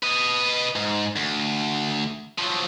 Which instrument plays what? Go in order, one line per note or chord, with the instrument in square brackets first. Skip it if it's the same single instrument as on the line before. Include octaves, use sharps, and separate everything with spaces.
[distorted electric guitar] B4 D#5
G#2
D2
F3 F#3